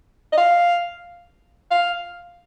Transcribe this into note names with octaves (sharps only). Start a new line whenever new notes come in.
D#5
F5
F5